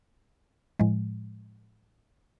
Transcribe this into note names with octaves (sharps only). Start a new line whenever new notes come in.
A2 F3 G#3